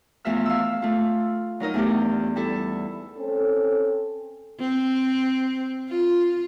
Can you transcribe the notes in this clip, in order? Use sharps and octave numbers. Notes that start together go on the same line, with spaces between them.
E2 F3 A3 F4 E5 F6
F5 E6
A3 F4
F#3 D#4 A#4 D#5
E2 A3 D4 G4
G3 E4 A4
C4 C#4 A4
C4
F4